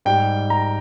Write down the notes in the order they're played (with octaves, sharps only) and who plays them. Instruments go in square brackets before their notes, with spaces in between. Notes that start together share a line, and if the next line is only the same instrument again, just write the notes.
[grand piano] G#2 G3 G5
A#5